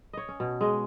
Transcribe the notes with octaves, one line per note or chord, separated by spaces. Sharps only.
C#5 D#5
C#4
B2
G#3 D#5